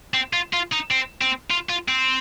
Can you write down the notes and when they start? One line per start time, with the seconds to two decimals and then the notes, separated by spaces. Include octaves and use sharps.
0.14 C4
0.33 F4
0.53 F4
0.73 D#4
0.91 C4
1.22 C4
1.51 F4
1.70 F4
1.89 C4